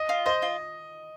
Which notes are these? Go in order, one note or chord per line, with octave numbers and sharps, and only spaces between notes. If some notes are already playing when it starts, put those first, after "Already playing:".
Already playing: D#5
F4
C5 D#5
F4